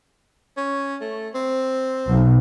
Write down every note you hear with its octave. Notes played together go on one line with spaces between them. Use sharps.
C#4
A3
C4
B1